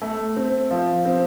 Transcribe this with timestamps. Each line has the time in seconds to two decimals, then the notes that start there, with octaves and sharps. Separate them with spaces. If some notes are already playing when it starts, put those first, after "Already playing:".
0.02 A3
0.36 C4
0.71 F3
1.05 C4